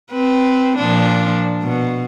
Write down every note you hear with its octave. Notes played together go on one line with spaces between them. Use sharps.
C4 B4
A#2 F3 D4
B2